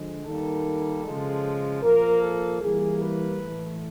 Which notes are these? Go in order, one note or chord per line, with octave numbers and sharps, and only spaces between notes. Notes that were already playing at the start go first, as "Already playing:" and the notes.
Already playing: D3 F3 G#3
D#3 G3 A#3 A4
C#3 F3 G#3
A#2 F3 A#3 A#4
A4
E3 G3 A#3 G#4
B4
A2 E3 A3